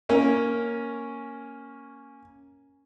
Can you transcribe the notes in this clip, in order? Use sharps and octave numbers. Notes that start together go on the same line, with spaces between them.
A#3 C#4 A#4